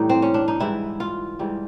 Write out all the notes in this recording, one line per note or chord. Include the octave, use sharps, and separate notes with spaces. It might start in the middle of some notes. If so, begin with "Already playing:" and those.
Already playing: A2 E3 G3 D#4
C4
C#4
D4
D#4
G#2 E3 G3 E4
F4
G#2 E3 G3